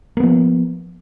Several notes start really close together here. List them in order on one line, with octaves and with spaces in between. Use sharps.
A#3 B3 F3